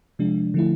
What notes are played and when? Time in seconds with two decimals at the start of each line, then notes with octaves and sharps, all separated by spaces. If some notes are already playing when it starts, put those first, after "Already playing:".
0.19 C3 F3 G#3 D4
0.54 D3 F3 A3 E4